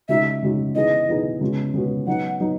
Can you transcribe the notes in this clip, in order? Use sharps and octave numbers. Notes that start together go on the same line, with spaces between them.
C#3 G#3 D#4 F#4 E5
C#3 G#3 D#4 F#4
E3 B3 D#4 G#4 D#5
E3 B3 D#4 G#4
C#3 G#3 B3 F#4
C#3 G#3 B3 F#4
F#3 B3 D#4 F#5
F#3 B3 D#4